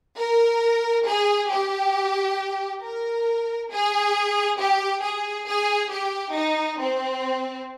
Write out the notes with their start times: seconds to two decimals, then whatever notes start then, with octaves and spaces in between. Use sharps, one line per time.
0.18 A#4
1.06 G#4
1.50 G4
2.82 A#4
3.70 G#4
4.59 G4
5.02 G#4
5.47 G#4
5.90 G4
6.35 D#4
6.79 C4